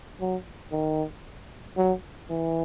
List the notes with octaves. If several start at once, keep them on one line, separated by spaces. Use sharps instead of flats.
F#3
D#3
F#3
E3